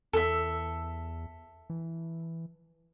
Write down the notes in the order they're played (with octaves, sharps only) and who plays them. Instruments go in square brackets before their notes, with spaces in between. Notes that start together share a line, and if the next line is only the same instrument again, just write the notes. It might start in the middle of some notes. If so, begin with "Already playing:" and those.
[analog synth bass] E2 [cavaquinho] A4 E5
[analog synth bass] E3